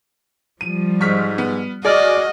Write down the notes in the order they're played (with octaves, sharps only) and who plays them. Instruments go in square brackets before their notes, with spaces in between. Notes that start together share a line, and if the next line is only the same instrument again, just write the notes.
[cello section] F3 G3 [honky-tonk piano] D#7
[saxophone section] G#2 [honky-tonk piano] C#6 F6 B6
[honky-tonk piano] B3
[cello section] F#4 [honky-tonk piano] G#4 F6 [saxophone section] D5 [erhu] D#5